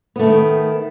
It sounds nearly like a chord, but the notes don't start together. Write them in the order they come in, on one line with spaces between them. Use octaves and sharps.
B3 A3 D#3